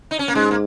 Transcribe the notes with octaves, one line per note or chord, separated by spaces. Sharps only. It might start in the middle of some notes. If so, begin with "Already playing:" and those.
D#4
C#4
A#3
G#2 G#3
A#3